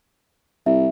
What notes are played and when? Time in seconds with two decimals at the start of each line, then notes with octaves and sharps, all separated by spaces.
0.66 C2 E5